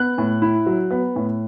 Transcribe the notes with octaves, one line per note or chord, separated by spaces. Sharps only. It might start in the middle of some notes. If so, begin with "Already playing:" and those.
Already playing: B3 F#6
A2
E4
F#3
B3
A2